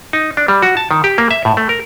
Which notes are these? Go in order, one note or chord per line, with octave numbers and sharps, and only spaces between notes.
D#4
D4
G3
F#4
A5
D#3
G4
A#3
E5
A2
A3
A#4